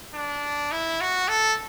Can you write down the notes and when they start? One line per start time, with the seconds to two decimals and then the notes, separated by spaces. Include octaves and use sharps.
0.14 D4
0.72 E4
1.01 F#4
1.28 A4